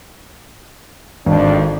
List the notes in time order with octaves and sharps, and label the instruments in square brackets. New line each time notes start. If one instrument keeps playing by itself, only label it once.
[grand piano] G#1 [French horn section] F2 D4